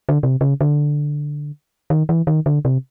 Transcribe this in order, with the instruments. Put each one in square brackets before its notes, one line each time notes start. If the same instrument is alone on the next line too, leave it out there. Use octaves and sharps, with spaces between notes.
[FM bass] D3
C3
C#3
D3
D#3
E3
D#3
D3
C3